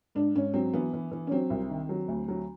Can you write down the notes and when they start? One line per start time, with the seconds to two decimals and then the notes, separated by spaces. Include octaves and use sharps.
0.15 G#2 D4
0.35 G#2 C#4
0.54 F#3 C4
0.74 E3 B3
0.93 E3
1.12 E3
1.27 C#4
1.31 F#3 C4
1.50 C2
1.70 D#3
1.89 F#3
2.08 D2
2.28 F#3